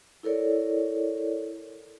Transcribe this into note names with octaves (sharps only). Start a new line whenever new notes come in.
E4 A4 A#4 C#5 D5